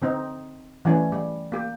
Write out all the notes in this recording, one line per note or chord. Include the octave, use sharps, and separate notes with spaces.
D3 C4 D#4
E3 G3 A3 C#4
G3
A#3 G4